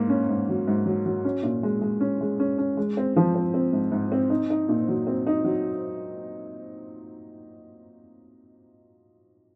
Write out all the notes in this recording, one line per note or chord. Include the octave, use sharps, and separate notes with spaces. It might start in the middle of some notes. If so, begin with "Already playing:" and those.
Already playing: G#2 A#3
C#4
G#2
F#3
G#2
F#3
F#3
C#4
A#2
G#3
G#3
C#4
G#3
C#4
C#4
G#3
C4
F3
C4
C4
G#2
G#2
C4
D#4
D#4
A#2
F#3
C4
D#4
F#3